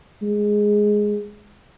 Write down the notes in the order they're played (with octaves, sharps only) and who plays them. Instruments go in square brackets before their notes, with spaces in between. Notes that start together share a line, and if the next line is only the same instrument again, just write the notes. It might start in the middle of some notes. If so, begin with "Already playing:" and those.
[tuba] G#3